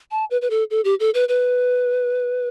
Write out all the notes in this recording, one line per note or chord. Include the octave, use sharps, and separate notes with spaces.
A5
B4
B4
A4
A4
G4
A4
B4
B4